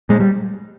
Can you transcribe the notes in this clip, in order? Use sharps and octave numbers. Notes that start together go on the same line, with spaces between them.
A#2 G#3
G3